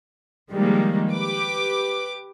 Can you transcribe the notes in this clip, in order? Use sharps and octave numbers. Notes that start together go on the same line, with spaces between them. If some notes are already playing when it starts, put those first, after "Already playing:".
D#3 F3 G3 G#3 A#3
G4 B4 D6